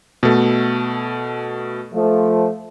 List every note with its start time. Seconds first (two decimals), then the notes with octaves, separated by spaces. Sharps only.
0.23 B2 A3
1.94 F3 A3